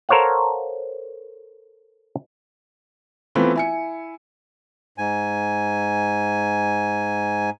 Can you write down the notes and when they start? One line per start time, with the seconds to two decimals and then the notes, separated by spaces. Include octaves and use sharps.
0.09 A4 A#4 C5 C#5 F5 F#5
3.35 E3 A3 B3 C4 F4
3.56 E4 G#5 C#7
4.98 G#2 G#5